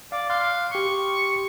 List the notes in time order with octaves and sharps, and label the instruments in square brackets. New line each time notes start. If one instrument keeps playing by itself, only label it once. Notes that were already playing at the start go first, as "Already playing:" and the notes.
[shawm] D5 [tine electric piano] F5
[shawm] F5 [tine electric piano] C6 F#6
[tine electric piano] G4 C6 [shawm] C#6